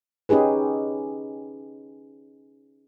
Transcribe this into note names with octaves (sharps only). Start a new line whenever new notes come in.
C#4 D#4 G4 G#4 B4